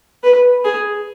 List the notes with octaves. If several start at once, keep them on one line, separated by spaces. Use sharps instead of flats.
B4
G#4